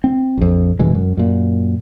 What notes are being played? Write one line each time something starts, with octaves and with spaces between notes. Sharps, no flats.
C4
A#1 F2
F1 B2 E3 G#3
F#2
F#2 A#2